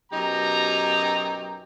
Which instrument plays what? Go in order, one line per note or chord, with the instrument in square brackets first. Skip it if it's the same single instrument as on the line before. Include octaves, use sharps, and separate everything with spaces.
[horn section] F#2 B2 D#4 G4 A#5